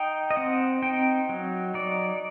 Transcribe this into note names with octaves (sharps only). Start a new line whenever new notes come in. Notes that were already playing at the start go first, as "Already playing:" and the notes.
Already playing: D#4 G5
D#5
C4 F#5
D#4 G5
F#3
D#4 D5